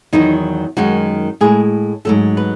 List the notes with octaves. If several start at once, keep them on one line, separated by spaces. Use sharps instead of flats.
E2 D#3 F#3 D#4
F#2 D#3 G#3 F#4
A2 G#3 G#4
G#2 F#3 A3 A4
B4